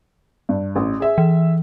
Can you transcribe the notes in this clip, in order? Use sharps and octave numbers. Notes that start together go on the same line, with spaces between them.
G2
A1
G#4 E5
E3